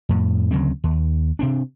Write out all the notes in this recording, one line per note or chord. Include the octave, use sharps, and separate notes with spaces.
F2 A2
D2 C#3 F#3 C4
D#2
C3 C4 D4